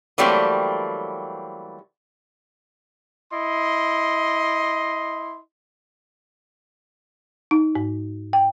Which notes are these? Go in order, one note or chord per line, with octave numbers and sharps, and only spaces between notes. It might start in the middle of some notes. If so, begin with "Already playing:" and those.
E3 F#3 G3 A3 A#3 C4
E4 D#5 C6
D#4
G#2
G5